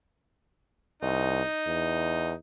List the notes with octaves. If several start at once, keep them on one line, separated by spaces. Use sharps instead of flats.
C2 D#4
E2